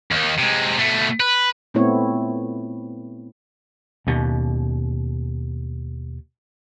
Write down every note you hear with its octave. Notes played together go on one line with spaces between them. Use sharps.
D#2 D#3
C3 G#3
B2 A3
B4
A#2 A3 B3 C4 E4 C#5
D#2 B2